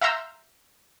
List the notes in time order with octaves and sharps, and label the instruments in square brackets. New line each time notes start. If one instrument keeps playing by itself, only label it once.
[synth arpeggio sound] E5 F5 A#5 C6 E6 G6